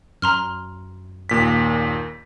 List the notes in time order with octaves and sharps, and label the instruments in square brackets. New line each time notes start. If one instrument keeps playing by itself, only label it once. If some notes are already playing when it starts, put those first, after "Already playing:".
[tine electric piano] F#2 [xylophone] A#5 C6 F6
[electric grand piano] D#2 A#2 B6